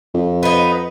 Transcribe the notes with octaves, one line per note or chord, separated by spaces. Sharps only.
F2
B3 D#4